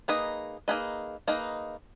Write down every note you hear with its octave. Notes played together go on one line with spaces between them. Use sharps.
A#3 D#4 G#4 B4 D#5
A#3 D#4 G#4 B4 D#5
A#3 D#4 G#4 B4 D#5